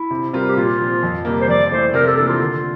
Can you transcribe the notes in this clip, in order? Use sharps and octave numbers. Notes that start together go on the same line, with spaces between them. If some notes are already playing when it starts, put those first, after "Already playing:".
Already playing: E4
C3
G3 C4 F4 A#4
G4
A#2 F4
F3 C4
F2
C3 G3 A#3
C5
F2 D5
E3 A3 C5
C3 A#4
A4
E3 A#3 D4 A4
F4
D3